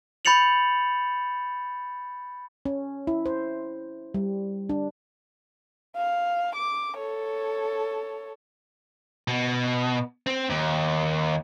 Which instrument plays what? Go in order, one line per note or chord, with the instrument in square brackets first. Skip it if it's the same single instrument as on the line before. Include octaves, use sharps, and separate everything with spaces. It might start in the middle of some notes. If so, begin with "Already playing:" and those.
[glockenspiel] B5 G6 A6 C#7 F7 F#7
[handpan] C#4
E4
C5
G3
D4
[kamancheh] F5
D6
A4 C#5
[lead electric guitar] B2
C4
D#2